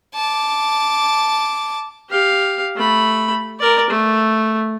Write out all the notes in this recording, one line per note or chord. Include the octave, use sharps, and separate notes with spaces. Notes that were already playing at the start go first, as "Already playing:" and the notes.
A5 D6
G4 F5
A3 B5
A#4 D5
A3